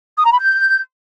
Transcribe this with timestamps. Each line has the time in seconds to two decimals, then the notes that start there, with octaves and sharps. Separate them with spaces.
0.17 D#6
0.24 A#5
0.31 B5
0.39 G6